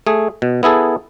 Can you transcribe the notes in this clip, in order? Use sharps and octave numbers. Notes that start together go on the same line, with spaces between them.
A3 G#4
B2
B3 E4 G#4 A4